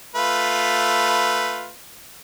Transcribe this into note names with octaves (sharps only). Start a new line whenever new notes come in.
A3 F4 B4